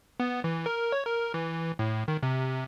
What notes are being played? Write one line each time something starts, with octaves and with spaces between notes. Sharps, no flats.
B3
E3
A#4
C#5
A#4
E3
A2
D#3
C3